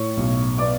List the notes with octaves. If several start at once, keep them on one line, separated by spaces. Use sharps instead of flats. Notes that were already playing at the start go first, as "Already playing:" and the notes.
Already playing: A2 C#5 C#6
B1
B3 D5 D6